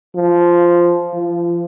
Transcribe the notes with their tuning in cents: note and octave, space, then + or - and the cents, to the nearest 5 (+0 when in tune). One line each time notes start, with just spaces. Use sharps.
F3 -5
F3 -30